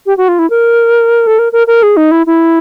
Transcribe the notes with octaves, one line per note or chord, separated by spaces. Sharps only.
G4
F#4
F4
E4
A#4
A4
A#4
A#4
A#4
G#4
D#4
E4
E4